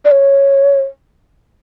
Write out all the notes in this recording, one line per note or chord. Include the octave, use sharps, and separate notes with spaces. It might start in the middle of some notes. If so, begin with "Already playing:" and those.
D5
C#5